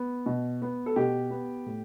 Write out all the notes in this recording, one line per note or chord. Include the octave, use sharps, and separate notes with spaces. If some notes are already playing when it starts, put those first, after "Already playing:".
Already playing: B3
B2
B3
A4
B2 G4
B3
A2